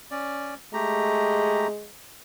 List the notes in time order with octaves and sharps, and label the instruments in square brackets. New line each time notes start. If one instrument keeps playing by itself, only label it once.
[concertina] C#4 D5
[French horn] G#3 [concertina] A3 G4 A#5